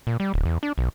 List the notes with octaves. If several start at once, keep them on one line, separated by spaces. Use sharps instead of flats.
A#2
G3
D1
E2
D4
B1